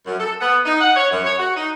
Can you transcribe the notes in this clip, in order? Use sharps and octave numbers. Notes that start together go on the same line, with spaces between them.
F#2
A4
B3
D#4
F#5
C#5
F#2
C#5
F#4
D#4